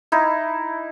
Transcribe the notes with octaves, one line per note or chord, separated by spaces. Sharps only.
D#4 E4